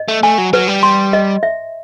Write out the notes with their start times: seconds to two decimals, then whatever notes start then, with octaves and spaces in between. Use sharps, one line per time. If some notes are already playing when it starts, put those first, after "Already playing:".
Already playing: D#5
0.08 A3
0.23 A3 G#5
0.38 F#3
0.53 F#3 B4
0.68 G3
0.83 C6
1.13 D#5
1.43 E5